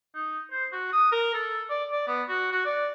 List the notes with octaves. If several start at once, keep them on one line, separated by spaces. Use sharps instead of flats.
D#4
C5
F#4
D#6
A#4
A4
D5
D5
B3
F#4
F#4
D5